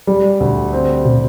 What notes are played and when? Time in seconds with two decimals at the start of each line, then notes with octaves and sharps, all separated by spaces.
0.07 G3
0.40 D2
0.73 C4
1.05 C3